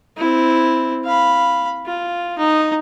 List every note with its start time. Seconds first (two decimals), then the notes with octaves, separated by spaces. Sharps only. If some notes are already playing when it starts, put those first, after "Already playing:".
0.17 C4 E4
1.04 F5 B5
1.85 F4
2.38 D#4